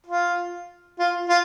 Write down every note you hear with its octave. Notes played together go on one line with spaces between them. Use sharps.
F4
F4
F4